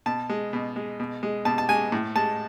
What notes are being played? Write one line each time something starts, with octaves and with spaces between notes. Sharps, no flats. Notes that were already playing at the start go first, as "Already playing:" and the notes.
B2 A5
G#3
B2
G#3
B2
G#3
B2 A5
A5
G#3 G#5
A2
G#3 A5